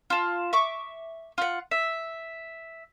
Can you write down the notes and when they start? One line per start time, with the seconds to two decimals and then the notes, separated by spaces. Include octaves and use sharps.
0.10 F4 A5
0.53 E5 C#6 D6
1.38 F4 F#5
1.71 E5